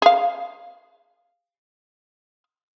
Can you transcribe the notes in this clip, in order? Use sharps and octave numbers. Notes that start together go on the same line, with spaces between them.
G#4 F5